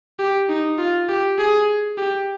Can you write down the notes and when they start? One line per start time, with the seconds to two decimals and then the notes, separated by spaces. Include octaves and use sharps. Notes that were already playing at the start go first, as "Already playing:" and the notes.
0.19 G4
0.49 D#4
0.78 F4
1.09 G4
1.39 G#4
1.97 G4